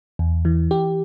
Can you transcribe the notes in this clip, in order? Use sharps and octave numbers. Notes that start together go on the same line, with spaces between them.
E2
E3
G4